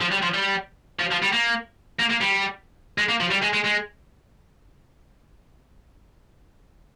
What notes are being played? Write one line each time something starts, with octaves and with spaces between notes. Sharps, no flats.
F3
G3
F3
G3
F3
F3
G3
A#3
A#3
A#3
G3
G#3
A#3
F3
G3
G#3
G#3
G#3